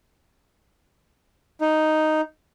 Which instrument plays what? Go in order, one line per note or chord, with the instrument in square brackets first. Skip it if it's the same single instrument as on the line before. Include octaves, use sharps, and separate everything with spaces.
[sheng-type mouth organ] D#4